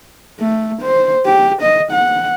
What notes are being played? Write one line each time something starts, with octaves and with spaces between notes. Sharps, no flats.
A3
C5
G4
D#5
F#5